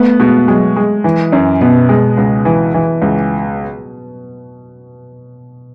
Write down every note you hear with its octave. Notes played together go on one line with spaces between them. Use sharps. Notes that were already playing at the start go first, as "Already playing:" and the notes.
Already playing: A3 B3
B2 G#3
F#3 G#3
G#3
E3
F#2
B2 B3
G#3
C#2
E3
E3
C#2